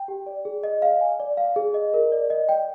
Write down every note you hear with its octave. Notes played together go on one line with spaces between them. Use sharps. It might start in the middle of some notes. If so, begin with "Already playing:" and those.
Already playing: G5
G4
D5
G#4
D#5
F5
G#5
D5
F5
G#4
D#5
A#4
D5
D#5
G5